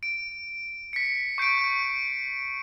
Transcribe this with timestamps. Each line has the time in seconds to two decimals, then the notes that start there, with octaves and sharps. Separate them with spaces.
0.03 D7
0.93 B6 C#7
1.38 C#6 G6 C7 D7